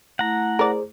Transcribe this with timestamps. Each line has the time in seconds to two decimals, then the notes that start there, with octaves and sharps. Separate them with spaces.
0.19 A3 E4 F#5 A#5
0.59 G#4 A#4 C5 D5